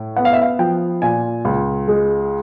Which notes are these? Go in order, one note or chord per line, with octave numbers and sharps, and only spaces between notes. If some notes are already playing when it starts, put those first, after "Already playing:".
Already playing: A2
B3 F#5
F5
E5
F5
F3 G5
A#2 G#5
C#2
G#3